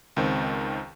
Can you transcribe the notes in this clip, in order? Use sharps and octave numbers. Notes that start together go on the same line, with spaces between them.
C#2 D#3 C4